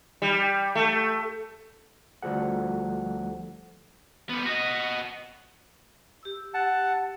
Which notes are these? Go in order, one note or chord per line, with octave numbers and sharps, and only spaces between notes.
G3
A3
D2 F3 G3 A4 F#5
G3 B3
F#4 D#5
G4 E6
F#5 A5